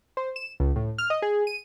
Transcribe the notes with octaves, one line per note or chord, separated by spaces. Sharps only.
C5
E7
C#2
A2
F6
D#5
G#4
D#7